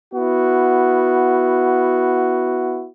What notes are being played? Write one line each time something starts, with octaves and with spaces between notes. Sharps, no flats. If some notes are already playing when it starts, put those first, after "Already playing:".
B3 E4 F#4